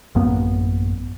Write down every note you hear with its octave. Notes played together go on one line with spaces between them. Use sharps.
A1 F#2 A#3 B3